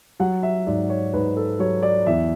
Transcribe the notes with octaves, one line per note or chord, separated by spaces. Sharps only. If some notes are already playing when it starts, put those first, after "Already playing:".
F#3 F#5
E5
G#2 D5
C#5
G#2 B4
A4
F#3 C#5
D5
E2 E5